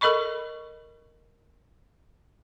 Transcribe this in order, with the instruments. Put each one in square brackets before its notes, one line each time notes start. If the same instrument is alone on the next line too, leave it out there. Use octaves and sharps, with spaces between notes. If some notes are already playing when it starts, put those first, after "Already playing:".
[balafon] A4 A#4 D#5 B5 C#6